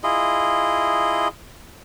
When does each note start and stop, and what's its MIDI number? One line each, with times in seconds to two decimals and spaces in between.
0.04 1.28 64
0.04 1.28 65
0.04 1.28 68
0.04 1.28 75